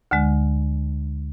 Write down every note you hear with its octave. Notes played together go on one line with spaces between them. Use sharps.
D2 D3 G#3